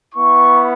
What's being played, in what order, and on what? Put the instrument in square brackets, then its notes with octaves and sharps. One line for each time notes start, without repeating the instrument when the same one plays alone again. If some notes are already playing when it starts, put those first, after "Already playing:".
[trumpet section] B3 E4 C#6